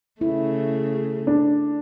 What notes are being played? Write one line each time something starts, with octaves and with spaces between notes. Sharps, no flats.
C#3 A3 E4
D4